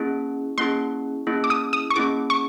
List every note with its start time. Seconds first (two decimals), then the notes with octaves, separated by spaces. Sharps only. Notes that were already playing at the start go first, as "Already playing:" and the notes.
Already playing: A#3 C#4 E4 G#4
0.58 A#3 C#4 E4 G#4 C6
1.27 A#3 C#4 E4 G#4
1.44 D6
1.50 D#6
1.73 D#6
1.90 C#6
1.96 A#3 C#4 E4 G#4 D6
2.30 C#6